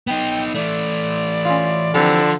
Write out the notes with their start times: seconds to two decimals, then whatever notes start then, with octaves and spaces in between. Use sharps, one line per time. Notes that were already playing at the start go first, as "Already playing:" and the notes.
0.07 B3 D#4 G5
0.55 E3 A3 D5
1.45 C#4 F4
1.94 D3 E3 F3 C4 G4